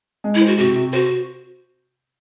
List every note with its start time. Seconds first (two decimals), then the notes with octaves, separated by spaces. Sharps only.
0.24 G#3
0.35 E4
0.41 C5
0.47 F#4
0.58 C3 F#4
0.76 C3
0.93 F#4 C5